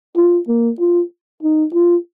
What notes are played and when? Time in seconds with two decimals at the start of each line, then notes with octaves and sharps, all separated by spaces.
0.16 F4
0.48 A#3
0.80 F4
1.42 D#4
1.74 F4